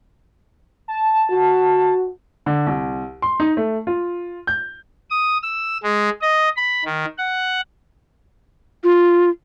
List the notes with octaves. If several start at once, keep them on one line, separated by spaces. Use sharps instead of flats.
A5
F#4
D3
C2
C6
D#4
A3
F4
G6
D#6
E6
G#3
D#5
B5
D#3
F#5
F4